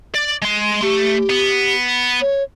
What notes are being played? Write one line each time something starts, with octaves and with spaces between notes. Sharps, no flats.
D5
G#3 C6
A3 G4
B3
C#5